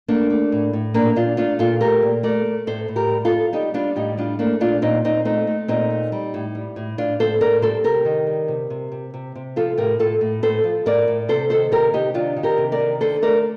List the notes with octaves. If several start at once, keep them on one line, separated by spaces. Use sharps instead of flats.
A3 A#3 D4
A3
A2
A2
A#2 A#3 D4
A#2 D4 F4
A3 D4 F4
A#2 F4 A4
A3 G4 A#4
A#2
A3 A#4 D5
A3
A2 A4 C5
A2
G4 A#4
G3
F4 A4
G3
G3 D#4 G4
G3 D4 F4
A2 D#4 G4
G3 D4 F4
A3 A#3 D4
A#2 D4 F4
A#2 C4 D#4
A#2 C4 D#4
A3 C4 D#4
A3
A#2 C4 D#4
A3
G3
A2
G3
A2
A2 D4 F4
A2 A4 C5
A2 A#4 D5
G3 A4 C5
C3 G4 A#4
D#3
G3
C3
C3
C3
C3
C3
F3 F4 A4
A2 G4 A#4
A2 F4 A4
A2
A2 A4 C5
F3
A2 A#4 D5
A2
C3 A4 C5
D#3 A4 C5
C3 G4 A#4
C3 D#4 G4
D#3 D4 F4
D#3
G4 A#4
C3
A#4 D5
D#3
D3 A4 C5
A3 A#4 D5